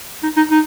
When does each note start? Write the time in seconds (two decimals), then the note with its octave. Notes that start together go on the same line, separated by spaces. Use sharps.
0.23 D#4
0.37 D#4
0.51 D#4